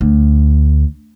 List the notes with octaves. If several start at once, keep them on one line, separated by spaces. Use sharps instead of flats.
D2